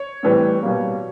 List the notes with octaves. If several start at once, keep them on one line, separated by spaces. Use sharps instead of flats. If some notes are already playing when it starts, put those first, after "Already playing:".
Already playing: C#5
A2 E3 G3 C4
B2 G3 A#3